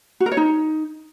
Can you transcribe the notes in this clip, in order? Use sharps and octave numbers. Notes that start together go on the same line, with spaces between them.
F#4
A#4
C#5
D#4